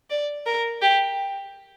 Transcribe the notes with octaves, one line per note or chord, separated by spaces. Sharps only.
D5
A#4
G4